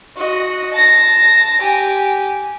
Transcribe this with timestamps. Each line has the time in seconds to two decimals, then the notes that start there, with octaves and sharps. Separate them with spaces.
0.16 F#4 D#5
0.73 A5 A#6
1.61 G4 G#5